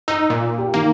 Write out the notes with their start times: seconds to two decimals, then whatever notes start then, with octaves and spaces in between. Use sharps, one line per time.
0.08 D#4 E6
0.30 A#2
0.58 G4
0.74 D#3 A#3